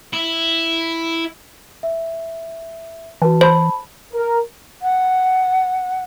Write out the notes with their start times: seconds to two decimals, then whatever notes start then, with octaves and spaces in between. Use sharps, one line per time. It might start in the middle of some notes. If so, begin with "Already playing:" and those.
0.13 E4
1.83 E5
3.22 E3 F#4 B4 A5
3.41 C5 A5 B5
4.13 A#4
4.81 F#5